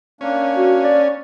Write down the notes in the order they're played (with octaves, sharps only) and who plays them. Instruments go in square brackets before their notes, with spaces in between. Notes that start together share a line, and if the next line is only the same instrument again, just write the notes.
[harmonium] A#3 D4 [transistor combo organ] C#4
[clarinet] F#4
D5